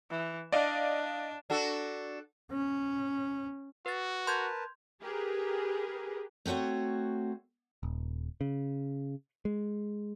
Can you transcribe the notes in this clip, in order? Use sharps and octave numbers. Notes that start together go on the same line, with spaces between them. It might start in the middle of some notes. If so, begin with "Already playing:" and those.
E3
D4 D5 D#5 F5
D4 F#4 A4
C#4
F#4 B4 A6
A#4 B4 A5 C6 G6 G#6
G4 G#4 A#4 B4
A3 C4 F#4 C#5 F#5
D#1
C#3
G#3